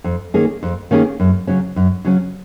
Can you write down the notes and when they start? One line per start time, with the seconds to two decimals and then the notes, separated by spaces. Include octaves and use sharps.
0.04 F2
0.34 D#3 A#3 C#4 G#4
0.63 F2
0.91 D#3 A#3 C#4 G#4
1.20 F#2
1.47 C#3 F#3 C#4
1.76 F#2
2.05 C#3 F#3 C#4